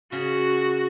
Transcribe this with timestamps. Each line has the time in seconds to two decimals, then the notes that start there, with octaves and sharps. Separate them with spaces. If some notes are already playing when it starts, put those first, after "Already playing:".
0.12 C#3 F#4